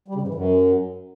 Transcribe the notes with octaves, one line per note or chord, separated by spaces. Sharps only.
G3
C#3
G#2
E3
F#2